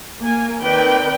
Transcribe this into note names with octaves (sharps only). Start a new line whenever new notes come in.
A#3 G#5
D#3 C4 B4 D5 G5